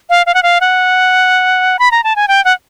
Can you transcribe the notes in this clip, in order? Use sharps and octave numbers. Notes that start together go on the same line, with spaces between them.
F5
F5
F#5
F5
F#5
B5
A#5
A5
G#5
G5
F#5